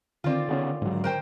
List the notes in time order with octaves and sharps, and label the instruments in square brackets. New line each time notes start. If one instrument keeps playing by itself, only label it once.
[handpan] D3 D#3 D5 [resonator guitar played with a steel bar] C4 F4
[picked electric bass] C#3 B3 C#4
G#2 F#3
[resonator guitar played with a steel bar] A#4 C5 G5